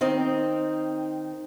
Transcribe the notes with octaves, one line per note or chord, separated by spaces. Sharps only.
D#3 C4 D#4